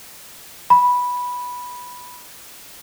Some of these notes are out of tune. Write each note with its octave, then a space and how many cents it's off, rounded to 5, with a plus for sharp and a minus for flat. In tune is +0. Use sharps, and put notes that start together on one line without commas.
B5 -5